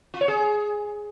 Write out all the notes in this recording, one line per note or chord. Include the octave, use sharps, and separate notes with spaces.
F4
C#5
G#4